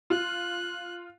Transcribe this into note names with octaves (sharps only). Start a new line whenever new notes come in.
F4 F#6